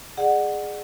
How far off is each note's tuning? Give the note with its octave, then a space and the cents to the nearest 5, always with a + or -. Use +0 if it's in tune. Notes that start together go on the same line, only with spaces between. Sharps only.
G#4 +0 D5 +35 F#5 +0